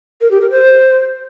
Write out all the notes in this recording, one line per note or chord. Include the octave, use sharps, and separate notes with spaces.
A#4
G4
A#4
C5